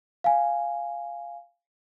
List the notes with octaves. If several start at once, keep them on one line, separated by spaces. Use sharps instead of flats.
F5 G#5